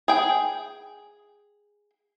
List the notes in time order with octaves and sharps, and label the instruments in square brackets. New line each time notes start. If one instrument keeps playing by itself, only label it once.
[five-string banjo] G#4 G5